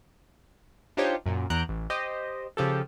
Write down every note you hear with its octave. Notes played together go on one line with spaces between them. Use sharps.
D4 D#4 F4 G4 C5 C#5
F#2 A#2
E2 A#5 F#6 G6 D7
A1
G4 C5 D#5
C#3 F3 G4 A4